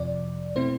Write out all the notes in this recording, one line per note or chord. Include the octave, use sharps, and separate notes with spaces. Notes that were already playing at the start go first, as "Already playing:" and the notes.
Already playing: F2 C3 F3 D5
B2 A3 C4 E4 C5